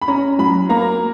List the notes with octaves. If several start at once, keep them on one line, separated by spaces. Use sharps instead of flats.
B5
C#4 A#5
F#3 B5
A#3 A#5